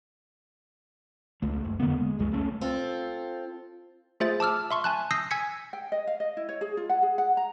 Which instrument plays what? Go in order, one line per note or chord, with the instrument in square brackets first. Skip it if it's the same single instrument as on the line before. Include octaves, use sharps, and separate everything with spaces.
[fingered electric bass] C#2 A3
F#1
E2 D3 A#3 B3
G#3
F#1 C#2 G#3
C#2 A3 C#4
[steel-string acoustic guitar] C4 F4 A4
[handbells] A3 F4 G#4 C5 E5 A6
A5 D6 E6 F6
E5 C6 C#6
G#5 A5 F#6
D#6 E6 G6 A#6 C7
G#5 E6 G#6 B6 C#7
[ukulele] G5
D#5
F5
D#5
E4
C#5
G#4
F4
F#5
G#4
F#5
A#5